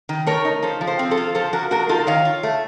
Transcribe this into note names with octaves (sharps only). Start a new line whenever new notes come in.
D#3
A3 A#4 C#5
D#4
F3 A4 C5
F3
A4 C5
C4
A4 C5
F4
F3 A4 C5
F3 F#4 A#4
A3 F#4 A#4
D#4 F4 A4
D#3 C#5 F5
F4
A3